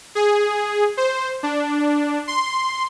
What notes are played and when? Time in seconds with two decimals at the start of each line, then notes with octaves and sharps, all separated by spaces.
0.15 G#4
0.97 C5
1.43 D4
2.27 C6